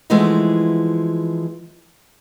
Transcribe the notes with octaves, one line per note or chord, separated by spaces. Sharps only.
E3 F3 G#3 A3 B3 D#4